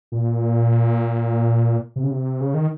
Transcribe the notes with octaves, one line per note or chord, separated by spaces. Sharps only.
A#2
C3
C#3
C3
C#3
D#3